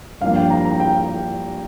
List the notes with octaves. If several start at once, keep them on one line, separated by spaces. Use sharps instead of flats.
G2 F3 A#3 F5
G5
A#5
A#5
G5